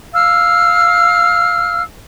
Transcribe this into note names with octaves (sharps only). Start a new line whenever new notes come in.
F5 E6 F6